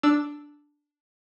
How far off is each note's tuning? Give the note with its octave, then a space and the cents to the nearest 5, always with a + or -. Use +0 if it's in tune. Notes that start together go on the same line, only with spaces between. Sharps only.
D4 +0 E6 +0